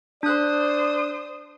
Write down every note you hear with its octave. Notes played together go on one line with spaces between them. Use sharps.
D4 C5 D5 D#6 F#6